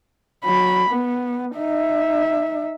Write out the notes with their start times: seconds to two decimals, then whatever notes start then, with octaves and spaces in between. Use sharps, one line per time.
0.45 F#3 B5
0.90 B3
1.57 D#4 E5